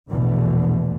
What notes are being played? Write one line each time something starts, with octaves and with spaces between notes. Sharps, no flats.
A#1 E2 B2 D3 E3 A3